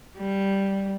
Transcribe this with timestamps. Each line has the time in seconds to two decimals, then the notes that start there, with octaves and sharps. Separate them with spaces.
0.18 G3